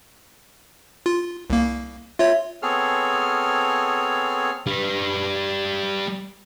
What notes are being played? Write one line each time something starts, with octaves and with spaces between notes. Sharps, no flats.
F4
C2 A#3
F4 C#5 E5
B3 C4 G#4 A4 C#5 F6
G3 B4